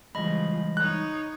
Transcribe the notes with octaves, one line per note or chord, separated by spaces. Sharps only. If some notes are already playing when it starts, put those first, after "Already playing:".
C#3 E3 F3 G3 G#3 D#5 B5
D#4 C#5 F#6